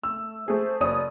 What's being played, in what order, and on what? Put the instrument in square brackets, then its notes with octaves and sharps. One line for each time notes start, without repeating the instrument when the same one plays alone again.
[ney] A3 [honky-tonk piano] E6
[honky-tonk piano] A3 G#4 [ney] C5
[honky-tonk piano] F#1 C#5 D#6 [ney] D5
[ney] D5